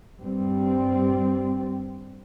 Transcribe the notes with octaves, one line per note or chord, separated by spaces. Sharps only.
G2 G3 C4